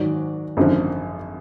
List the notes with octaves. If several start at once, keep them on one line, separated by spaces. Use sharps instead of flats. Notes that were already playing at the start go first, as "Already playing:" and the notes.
Already playing: G#2 D#3 F#3 D5
G#1 F#2 D3 F3